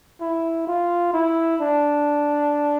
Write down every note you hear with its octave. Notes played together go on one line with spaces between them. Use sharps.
E4
F4
E4
D4